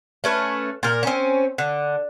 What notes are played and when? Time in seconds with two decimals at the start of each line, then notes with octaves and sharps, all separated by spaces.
0.24 A3 C#4 B4
0.83 A#2 A#4
1.03 C4 C#4
1.58 D3